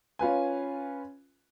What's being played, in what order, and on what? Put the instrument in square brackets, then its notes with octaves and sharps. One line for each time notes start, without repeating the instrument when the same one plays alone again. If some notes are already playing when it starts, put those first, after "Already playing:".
[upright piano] C#4 F4 B4 G#5